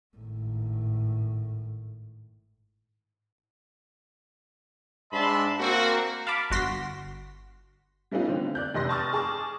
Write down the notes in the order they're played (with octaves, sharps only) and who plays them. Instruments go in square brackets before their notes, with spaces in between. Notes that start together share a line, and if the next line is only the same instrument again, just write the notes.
[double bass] G#1 A2
[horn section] G#2 D4 E5 A5 B5 C6
A#3 C4 F#4
[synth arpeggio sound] F5 A5 B5 D6
G1 F#4 C6 A#6 B6
[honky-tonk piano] G3 A3 B3 C#4 D#4 F4
D3 C4
D5 F#6 G6
F1 D#5 C6 A#6
A5 C6 C#6 D#6 F6 A6
G#4 A5 C#6 D6